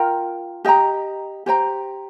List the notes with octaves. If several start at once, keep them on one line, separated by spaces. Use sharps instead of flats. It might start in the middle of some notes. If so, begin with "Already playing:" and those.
Already playing: F4 A#4 G5 A#5
G4 D#5 G5 A#5
G4 C5 G5 A#5